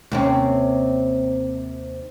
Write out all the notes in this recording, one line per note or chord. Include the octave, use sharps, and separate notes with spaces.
D#2 C3 C#4